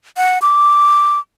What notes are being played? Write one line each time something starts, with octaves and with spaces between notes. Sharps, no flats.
F#5
D6